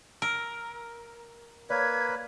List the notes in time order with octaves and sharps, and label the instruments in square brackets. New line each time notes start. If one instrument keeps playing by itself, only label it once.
[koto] A#4 [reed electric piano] E6
[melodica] A#3 B4 [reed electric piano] C#5 D5 [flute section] G#6